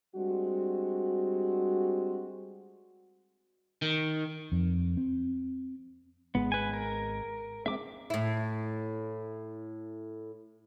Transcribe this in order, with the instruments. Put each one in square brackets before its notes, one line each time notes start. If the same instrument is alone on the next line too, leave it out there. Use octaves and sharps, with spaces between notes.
[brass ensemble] G3 G#3 C4 D4 F#4
[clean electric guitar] D#3
[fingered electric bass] F2
C4
[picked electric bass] G#1 G#3 [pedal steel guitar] B3
[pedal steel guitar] B4 G#5
A#4
[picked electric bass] G#3 A3 C4 [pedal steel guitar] E5 D6
[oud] A2 E4